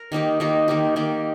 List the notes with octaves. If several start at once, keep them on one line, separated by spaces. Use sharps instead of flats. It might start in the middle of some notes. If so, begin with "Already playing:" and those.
Already playing: A#4
D#3 A#3 D#4 G4
D#3 A#3 D#4 G4
D#3 A#3 D#4 G4
D#3 A#3 D#4 G4